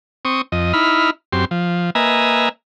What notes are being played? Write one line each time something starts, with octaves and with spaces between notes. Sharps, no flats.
C4 C#6 D#6
F2 D#5
D#4 E4 B5 F6
F#2 C4 G4 C6
F3
A#3 B4 D#5 E5 G#5 A#5